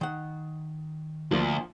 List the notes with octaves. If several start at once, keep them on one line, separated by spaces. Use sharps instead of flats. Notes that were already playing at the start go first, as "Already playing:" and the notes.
D#3 F#5
D2 F3 A#3